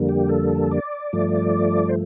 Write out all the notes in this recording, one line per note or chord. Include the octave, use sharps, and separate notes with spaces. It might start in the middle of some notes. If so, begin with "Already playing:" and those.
Already playing: F2 D3 G3 A#3
G4
A4
D5
G2 F3 A3
C5